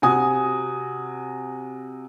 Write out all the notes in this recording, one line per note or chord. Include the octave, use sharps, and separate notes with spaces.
C3 F#4 G#5 D#6